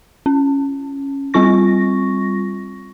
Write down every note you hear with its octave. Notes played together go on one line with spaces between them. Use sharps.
C#4
G3 C4 F4 C#6 A#6